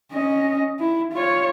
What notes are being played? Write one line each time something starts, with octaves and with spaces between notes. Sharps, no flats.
C#4 D#5
E4
F4 C#5